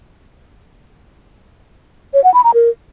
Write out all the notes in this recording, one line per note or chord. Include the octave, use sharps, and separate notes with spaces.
C#5
F#5
B5
A#5
A#4